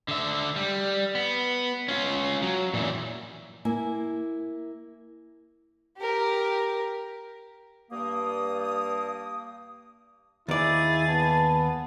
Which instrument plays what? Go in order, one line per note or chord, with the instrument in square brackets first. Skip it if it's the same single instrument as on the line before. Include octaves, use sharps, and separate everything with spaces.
[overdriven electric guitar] D3 E5
G3
B3
C#4 F4
F#3
A#2 E3
[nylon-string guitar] A#3 E4 G#5
[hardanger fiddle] G4 A#4
[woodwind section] G2 A#3 D#6
[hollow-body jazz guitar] D#2 D5 [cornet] E4 [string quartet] G#4 A6
[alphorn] B3 [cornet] A5